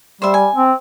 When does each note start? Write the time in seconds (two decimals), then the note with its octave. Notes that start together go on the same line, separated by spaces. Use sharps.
0.22 G3 C5 E5
0.34 G#5
0.56 C4